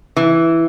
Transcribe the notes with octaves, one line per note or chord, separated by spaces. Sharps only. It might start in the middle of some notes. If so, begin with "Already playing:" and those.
E3